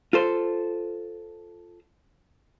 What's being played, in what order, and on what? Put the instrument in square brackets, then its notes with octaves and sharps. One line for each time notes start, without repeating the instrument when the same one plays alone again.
[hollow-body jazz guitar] F4 A4 C5